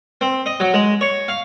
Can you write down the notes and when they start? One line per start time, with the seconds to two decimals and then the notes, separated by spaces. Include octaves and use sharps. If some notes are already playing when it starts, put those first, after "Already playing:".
0.21 C4
0.46 D#5
0.60 F#3
0.74 G#3
1.01 C#5
1.28 F5